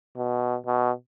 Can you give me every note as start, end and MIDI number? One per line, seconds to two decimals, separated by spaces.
0.17 0.56 47
0.66 0.91 47